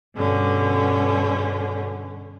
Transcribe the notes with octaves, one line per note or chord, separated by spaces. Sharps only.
G2 B2 D3 C#4